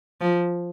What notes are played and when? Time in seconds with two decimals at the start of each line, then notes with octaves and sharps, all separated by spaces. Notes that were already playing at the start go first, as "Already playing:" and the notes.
0.21 F3